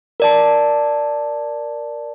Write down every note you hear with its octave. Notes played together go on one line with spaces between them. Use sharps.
A#4 D5 A5